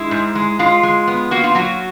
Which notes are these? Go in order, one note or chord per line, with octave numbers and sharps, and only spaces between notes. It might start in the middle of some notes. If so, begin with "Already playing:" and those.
Already playing: G#3 E4
G#2
G#3
G#3 F4
G#3
B3
A#3 F#4
F4
F#3 F#4